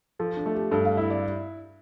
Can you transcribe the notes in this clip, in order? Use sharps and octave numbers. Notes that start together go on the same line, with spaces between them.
F3 A4
D4
A3
G4
G2 A4
F5
E4 E5
D5